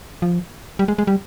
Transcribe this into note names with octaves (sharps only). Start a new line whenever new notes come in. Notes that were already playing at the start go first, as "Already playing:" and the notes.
F3
G3
G#3
G#3
G3